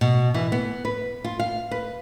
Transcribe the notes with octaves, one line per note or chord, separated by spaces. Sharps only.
B2
E3
B3
B4
F4
F5
B4